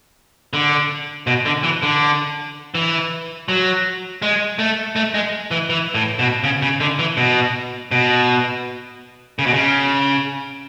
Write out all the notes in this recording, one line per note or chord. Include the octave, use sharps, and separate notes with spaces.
D3
B2
D3
E3
D3
E3
F#3
G#3
A3
A3
G#3
E3
E3
A2
B2
C#3
C#3
D3
E3
B2
B2
C#3
B2
C#3